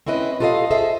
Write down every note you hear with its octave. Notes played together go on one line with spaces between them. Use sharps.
C4 C#4 E4 B4 D#5
F4 G4 A4 C#5 D#5 F5
G#4 A4 C5 D#5 E5